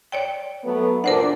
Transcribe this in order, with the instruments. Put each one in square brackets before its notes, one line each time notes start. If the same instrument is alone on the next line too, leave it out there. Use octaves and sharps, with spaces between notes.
[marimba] C#5 D5 G5
[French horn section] F#3 A3 B3
[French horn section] E2 A#2 D4 [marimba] A#4 C5 F#5